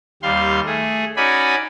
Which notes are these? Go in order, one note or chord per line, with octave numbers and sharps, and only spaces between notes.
D#2 G3 F5 C6
A3 G#4
C#4 D#4 F#4 D5 G#5 B5